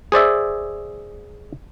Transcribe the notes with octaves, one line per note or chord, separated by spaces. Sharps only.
G#4 C5 D5 E5